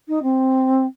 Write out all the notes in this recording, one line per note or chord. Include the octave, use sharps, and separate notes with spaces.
D#4
C4